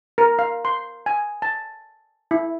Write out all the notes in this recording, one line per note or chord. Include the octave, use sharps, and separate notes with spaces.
A#4
F5
C6
G#5
A5
E4